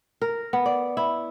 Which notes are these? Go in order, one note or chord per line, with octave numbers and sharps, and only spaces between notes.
A#4
B3
D5
E4